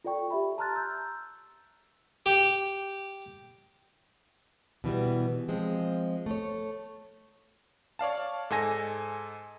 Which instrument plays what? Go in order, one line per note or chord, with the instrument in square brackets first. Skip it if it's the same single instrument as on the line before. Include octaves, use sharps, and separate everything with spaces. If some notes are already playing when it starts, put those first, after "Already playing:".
[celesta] F4 A4 D5 G5 C#6
G4 E5 B5
A5 A#5 C6 F6 F#6 A6
E6 G6
[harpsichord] G4
[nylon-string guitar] B2 E3 G3 B3
F3 G#3 C4
A3 C#5
[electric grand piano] C#5 D5 F5 A5
G#2 A4 G#5 A#6